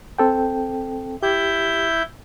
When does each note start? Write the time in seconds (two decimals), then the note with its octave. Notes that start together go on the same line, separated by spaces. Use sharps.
0.18 C4 A4 G5
1.23 E4 G4 G6